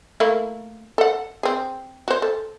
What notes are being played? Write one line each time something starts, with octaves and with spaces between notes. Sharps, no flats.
A3 A#3 E4
A4 F#5
C4 G#4
F#4 C5
A4